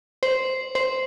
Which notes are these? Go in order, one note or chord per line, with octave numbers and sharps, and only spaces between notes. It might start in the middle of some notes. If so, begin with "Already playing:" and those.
C5
C5